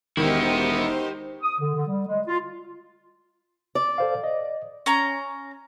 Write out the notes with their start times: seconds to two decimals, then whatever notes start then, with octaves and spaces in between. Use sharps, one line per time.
0.17 E1 D#3 B3 D#4 E4 G4 C5
1.43 D#6
1.59 D3
1.74 D3
1.88 G3
2.07 G#3
2.27 F4
3.75 D5
3.98 A4 C5 F5
4.24 D#5
4.86 C#4 A#5